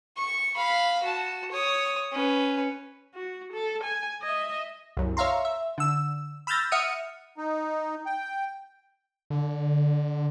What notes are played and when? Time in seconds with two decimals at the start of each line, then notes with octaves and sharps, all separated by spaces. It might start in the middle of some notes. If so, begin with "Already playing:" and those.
0.17 C#6
0.56 F5 B5
1.03 F#4 A5
1.51 C#5 D#6
2.12 C#4 B4
3.14 F#4
3.53 A4
3.83 G#5
4.22 D#5 E5
4.97 C2 F#2
5.17 C#5 E5 F5 A#5 C6
5.45 E5
5.78 D3 E6
6.47 B5 E6 F6 G6 A6 A#6
6.72 E5 F#5 D#6 F6 C#7 D#7
7.38 D#4
8.06 G5
9.30 D3